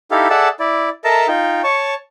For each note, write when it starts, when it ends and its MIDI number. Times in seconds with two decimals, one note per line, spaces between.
0.11 0.28 63
0.11 0.28 64
0.11 0.28 67
0.11 0.28 69
0.11 0.28 77
0.30 0.49 68
0.30 0.49 69
0.30 0.49 74
0.30 0.49 76
0.30 0.49 78
0.30 0.49 81
0.60 0.89 64
0.60 0.89 74
1.04 1.27 69
1.04 1.27 70
1.04 1.27 75
1.04 1.27 76
1.04 1.27 81
1.04 1.27 82
1.28 1.62 63
1.28 1.62 65
1.28 1.62 79
1.64 1.94 73
1.64 1.94 81
1.64 1.94 85